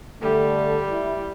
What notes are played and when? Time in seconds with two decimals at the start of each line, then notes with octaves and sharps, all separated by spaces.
0.22 D3 G3 A3
0.91 E4